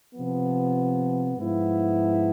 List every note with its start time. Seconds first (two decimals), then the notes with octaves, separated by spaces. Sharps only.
0.14 C3 F3 B3
1.38 G#2 F3 B3 E4